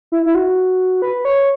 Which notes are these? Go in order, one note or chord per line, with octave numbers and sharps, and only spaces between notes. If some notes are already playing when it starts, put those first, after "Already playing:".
E4
E4
F#4
B4
C#5